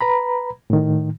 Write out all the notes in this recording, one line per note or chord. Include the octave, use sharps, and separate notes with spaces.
B4 A#5 B5
A2 D#3